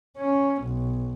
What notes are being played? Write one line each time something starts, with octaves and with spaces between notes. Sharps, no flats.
C#4
B1